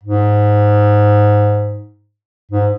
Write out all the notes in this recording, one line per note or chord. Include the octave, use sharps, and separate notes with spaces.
G#2
G#2